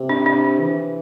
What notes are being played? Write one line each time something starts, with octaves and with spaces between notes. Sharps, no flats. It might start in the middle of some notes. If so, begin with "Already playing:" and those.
Already playing: C3
D4
D4
E3